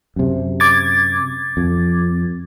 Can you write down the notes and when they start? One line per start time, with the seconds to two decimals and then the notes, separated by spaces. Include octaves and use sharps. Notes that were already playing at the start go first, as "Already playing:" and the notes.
0.16 F#2 C3
0.60 D6 G#6 A6
1.57 F2